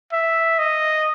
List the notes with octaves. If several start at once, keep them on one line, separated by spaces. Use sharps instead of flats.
E5
D#5